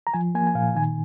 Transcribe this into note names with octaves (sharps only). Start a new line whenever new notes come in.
A#5
F3 G#5
A#3 G#5
G#5
A#2 F5
D#3 G#5